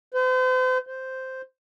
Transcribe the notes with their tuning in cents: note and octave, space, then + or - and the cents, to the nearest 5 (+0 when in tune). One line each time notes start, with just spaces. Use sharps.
C5 -40
C5 -5